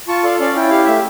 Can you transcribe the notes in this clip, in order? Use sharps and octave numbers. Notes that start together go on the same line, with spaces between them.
F4 A5 C#6
A4 D5 F5
C#4 D5 F5
E4 G5
G4 F5
A3 E5